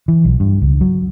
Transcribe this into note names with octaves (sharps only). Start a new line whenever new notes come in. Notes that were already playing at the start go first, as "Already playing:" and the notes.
E3
B1
G2
C#2
F#3